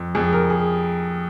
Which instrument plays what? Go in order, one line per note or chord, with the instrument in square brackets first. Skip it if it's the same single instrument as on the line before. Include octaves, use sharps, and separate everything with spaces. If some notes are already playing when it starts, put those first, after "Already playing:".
Already playing: [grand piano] F2
[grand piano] F2 [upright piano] G#4
[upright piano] A#4
G#4